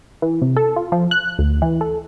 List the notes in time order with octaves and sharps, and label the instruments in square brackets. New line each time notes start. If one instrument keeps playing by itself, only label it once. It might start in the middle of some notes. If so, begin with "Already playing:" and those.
[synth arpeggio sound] E3
C3
A4
F4
F3
F#6
D2
E3
A4